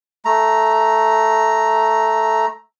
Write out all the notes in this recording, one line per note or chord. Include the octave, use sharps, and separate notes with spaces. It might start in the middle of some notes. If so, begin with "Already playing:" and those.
A3 A#5